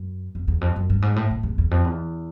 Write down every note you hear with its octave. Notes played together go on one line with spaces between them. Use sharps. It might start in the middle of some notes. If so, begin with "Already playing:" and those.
Already playing: F#2
F2
E2
F2
F#2
G2
G#2
A2
A2
E2
E2
F2
E2